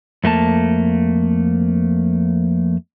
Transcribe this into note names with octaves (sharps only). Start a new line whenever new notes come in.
F2 A3 A#3 A5